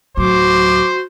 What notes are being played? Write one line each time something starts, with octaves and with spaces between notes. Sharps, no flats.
D1 F#3 F#4 C5 D6